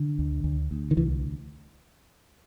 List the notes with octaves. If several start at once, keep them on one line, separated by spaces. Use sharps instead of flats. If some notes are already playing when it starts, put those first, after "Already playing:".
Already playing: D3
D2
D2
D2
D#3
C2 E3